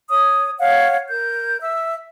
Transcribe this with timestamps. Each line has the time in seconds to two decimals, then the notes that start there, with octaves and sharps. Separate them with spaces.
0.10 C#5 D#6
0.59 C#5 F5 F#5
1.09 A#4 G6
1.62 E5 E6